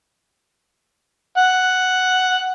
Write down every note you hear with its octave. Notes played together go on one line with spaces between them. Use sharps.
F#5